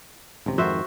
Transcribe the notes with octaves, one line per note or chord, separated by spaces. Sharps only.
D#1 C#2 C3
F2 G#2 D#3 F#4 C5 E5